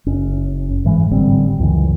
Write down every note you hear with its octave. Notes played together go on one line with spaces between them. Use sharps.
F#1 C#4
G#2 E3 G#3
A1 D3 G3 C4
C#2 F#2 E3